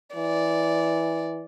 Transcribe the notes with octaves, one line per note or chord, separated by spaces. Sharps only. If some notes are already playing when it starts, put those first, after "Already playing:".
E3 D5